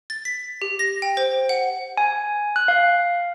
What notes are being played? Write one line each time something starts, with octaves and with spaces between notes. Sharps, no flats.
A6
B6
G4
A#6
G5
C5
F#5
G#5
F#6
F5